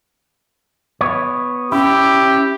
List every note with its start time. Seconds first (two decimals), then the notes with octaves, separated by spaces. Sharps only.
1.01 B3 C#5
1.72 C#4 E4 G4